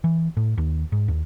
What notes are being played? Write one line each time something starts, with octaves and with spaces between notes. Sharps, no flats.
E3
A2
D#2
G#2
D#2